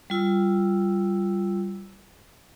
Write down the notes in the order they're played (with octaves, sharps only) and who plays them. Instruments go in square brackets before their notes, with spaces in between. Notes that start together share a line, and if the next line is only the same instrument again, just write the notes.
[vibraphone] G3 F4 E6